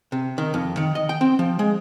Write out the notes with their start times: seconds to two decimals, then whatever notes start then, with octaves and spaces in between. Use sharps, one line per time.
0.12 C3
0.38 D#3
0.54 F2
0.77 D#3
0.95 D#5
1.09 G5
1.21 C4
1.39 F3
1.59 G#3